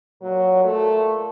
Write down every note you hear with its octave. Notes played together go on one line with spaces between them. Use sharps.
A#2 F#3
A3